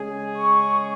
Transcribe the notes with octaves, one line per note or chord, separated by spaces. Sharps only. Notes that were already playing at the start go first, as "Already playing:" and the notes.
Already playing: C#3 G#3 C#4 G#4
C#6